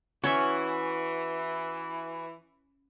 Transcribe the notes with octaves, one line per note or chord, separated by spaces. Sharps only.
E3 C#4 E4 F#4 C#5 E5